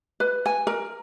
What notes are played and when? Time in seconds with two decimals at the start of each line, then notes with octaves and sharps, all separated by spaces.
0.20 B4
0.46 G#5
0.67 A#4